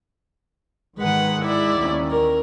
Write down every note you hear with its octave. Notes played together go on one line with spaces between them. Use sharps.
G#2 D#3 G#3 B4 F#5
E4 D5
D#2 D#3 C#4
A#4